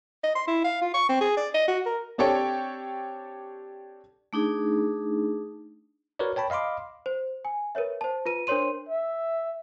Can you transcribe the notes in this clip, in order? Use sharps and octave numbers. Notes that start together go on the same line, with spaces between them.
D#5
C6
E4
F5
F4
C#6
C4
G#4
D5
D#5
F#4
A#4
C4 D4 G4 A4 C#5 G5
A3 D4 D#4 G#4
F#4 A#4 B4 C#5 D5
C#5 G5 A5 B5
D#5 F5 B5 C6 D6
C5
G#5
A#4 B4 C#5 E5
C5 A5
F4 B4 D#7
D4 A#4 C5 C#5 C6 D#7
E5